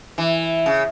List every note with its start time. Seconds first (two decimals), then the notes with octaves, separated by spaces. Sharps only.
0.18 E3
0.66 C#3